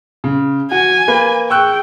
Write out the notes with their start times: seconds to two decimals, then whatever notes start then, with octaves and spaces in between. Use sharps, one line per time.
0.24 C#3
0.71 F#4 G#5
1.08 A#3 B4
1.50 G#4 G5 C#6 E6 F#6